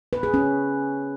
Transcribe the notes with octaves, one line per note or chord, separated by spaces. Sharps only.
B4
G#4
C#4